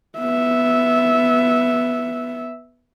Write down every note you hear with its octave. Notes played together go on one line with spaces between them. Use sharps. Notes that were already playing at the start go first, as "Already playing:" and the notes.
B3 E5